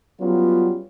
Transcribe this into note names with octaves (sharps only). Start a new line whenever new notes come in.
F#3 G3 B3 C#4 F4